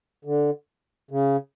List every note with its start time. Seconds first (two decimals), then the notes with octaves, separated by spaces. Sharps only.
0.25 D3
1.11 C#3